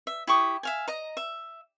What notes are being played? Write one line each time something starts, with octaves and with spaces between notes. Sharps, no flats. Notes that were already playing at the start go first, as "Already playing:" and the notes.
E5
E4 G4 C#6 D#6
E5 F5 G#5
D#5 A#5
E5